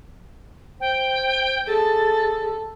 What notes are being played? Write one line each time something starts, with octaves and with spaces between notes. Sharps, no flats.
C5 G5
G#4 A4 A6